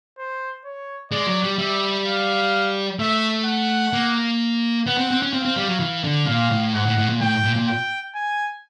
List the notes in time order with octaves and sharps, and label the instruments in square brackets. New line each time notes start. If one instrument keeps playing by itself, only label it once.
[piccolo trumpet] C5
C#5
[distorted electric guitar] G#3 [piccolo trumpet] D5
[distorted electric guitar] F#3
G3
[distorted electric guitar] G3 [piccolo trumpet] E5
[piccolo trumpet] F5
[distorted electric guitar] A3 [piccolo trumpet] E5
[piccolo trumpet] F#5
[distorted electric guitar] A#3
[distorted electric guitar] B3 [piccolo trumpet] F#5
[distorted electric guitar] C4
C4
C#4
[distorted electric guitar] C4 [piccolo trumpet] F5
[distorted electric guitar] C4
G3
F#3
E3
D3
[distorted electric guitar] A#2 [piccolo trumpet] F5
[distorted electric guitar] A2
[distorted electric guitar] G#2 [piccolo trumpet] F#5
[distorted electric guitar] A2
A2
A#2
[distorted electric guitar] A2 [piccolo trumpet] G5
[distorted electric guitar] A#2
A#2
[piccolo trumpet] G5
G#5